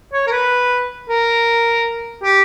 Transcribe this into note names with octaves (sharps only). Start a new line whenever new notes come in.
C#5
A#4
B4
A#4
G4